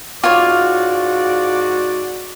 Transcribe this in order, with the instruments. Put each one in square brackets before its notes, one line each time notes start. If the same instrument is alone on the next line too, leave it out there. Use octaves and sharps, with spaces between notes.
[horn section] G#2 F#4 D5 [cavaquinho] F4 C#5